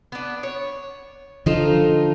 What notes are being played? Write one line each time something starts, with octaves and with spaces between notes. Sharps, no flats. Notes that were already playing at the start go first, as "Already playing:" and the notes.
B3 D4
C#5
D3 F3 D#4 F4 A4